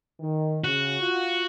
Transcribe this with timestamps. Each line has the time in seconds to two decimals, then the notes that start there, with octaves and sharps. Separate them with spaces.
0.20 D#3
0.64 C#3 F#4
1.00 F4